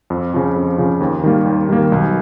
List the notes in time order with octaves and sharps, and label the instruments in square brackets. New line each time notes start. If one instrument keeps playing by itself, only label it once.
[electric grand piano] F2
C#3 F3
F2
C#3 F3
D#2
D#3 G3 A#3
D#2
D#3 G3 A#3
B1